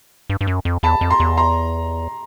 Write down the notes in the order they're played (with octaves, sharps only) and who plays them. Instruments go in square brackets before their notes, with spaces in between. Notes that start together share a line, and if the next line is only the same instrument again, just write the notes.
[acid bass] G2
G2
F#2
F2
[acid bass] E2 [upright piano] A5 B5
[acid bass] F2
[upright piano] A#5 C6
[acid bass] E2
[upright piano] A#5 C6